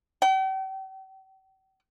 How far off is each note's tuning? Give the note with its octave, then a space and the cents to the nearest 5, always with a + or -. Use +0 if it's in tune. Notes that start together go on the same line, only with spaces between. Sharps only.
G5 -45